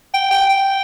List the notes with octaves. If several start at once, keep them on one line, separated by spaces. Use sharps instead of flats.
G5
G5
G5